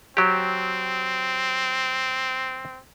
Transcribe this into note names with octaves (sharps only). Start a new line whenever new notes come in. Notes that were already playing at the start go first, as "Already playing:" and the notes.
F#3 C4 G4